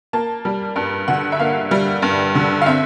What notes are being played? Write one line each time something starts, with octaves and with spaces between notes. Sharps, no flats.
A#3 A5
G3
G2 A5
D3 F#5
E5
A#3 F5
G3
G2
D3
F5
C4 E5